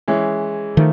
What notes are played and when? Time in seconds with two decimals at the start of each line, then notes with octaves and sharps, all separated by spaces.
0.08 E3 G#3 C#4 E4
0.77 D#3 F3 A3